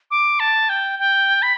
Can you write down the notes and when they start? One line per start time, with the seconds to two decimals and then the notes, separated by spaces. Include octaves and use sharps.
0.11 D6
0.40 A5
0.69 G5
0.99 G5
1.42 B5